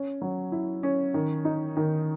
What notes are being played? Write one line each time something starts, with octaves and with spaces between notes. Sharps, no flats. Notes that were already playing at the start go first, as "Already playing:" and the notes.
Already playing: C#4
F#3
E4
C#4
D#3
D#4
D#3